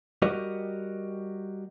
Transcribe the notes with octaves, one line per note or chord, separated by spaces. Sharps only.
G3 F#4 G4 A#4 D#5